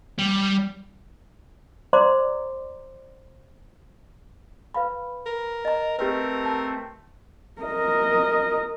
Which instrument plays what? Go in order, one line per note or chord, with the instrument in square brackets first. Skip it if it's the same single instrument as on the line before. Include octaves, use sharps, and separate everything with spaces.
[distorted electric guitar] G3
[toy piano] C5 D5 A#5 C6 D6
B4 F5 B5
[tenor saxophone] A#4
[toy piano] D#5 A#5
[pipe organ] A3 C4 [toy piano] G4 B4 [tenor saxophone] A#4
[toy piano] A5
[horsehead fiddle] A#4 D#5